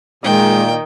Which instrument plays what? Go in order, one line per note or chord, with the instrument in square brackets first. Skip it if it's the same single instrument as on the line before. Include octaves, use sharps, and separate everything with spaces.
[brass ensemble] A#2 [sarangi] D#3 [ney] G#3 [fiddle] G5